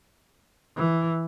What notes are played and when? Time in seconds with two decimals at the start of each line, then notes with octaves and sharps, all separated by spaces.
0.77 E3